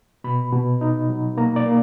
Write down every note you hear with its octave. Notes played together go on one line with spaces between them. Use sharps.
B2 B5
B2
D#4
F#3
A#3 A#5
D5
A#3